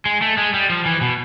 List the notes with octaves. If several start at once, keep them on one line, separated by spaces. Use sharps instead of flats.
G#3
A3
G#3
G3
F3
E3
B2